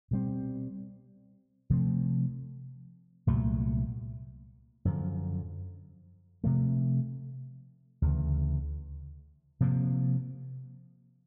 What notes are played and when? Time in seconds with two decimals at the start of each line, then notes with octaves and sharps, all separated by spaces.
0.11 B2 G3 C4
1.70 C3 F3 A3 C4
3.27 C2 A#2 F#3 A3
4.85 F#2 D3 F3
6.44 C3 F3 A3
8.02 D2 C#3 E3
9.61 C3 F3 A#3